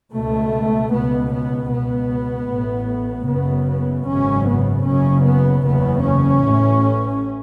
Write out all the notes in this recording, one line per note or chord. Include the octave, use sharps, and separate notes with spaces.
C#2 B2 A3
C#2 B2 B3
B3
C#2 B2 B3
A1 A2
F#1 F#2 C#3 B3
B3
G#1 F#2 C#3 C#4
B3
F#1 F#2 C#3 C#4
B3
F#1 E2 C#3 B3
C#4
A1 A2